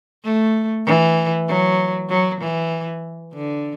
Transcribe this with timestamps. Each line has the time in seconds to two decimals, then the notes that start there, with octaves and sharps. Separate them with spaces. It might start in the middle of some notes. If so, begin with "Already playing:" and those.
0.25 A3
0.86 E3
1.48 F#3
2.10 F#3
2.41 E3
3.34 D3